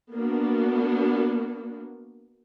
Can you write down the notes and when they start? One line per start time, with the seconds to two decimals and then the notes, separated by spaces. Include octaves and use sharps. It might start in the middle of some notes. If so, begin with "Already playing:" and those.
0.12 A#3 B3 D4 F#4